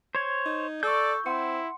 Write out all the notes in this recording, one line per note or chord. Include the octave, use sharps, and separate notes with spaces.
C5 C#5 G#6
D#4
A4 D5 C#6 E6 G6
C4 E4 F#5 C6 C#7